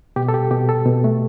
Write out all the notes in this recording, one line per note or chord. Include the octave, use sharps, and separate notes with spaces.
B2 G4
A4
G4
B2 G4
A4
B2
A3